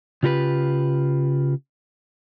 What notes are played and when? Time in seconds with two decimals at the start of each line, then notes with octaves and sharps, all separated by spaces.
0.23 C#3 F4 G4 A#4 B4